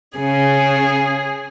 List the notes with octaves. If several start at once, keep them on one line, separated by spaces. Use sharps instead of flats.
C#3 G#4